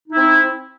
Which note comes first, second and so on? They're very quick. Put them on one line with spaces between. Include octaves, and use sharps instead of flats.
D#4 E4 C4